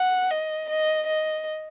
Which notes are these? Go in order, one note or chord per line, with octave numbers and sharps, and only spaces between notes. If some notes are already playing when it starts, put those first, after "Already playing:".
Already playing: F#5
D#5
D#5
D#5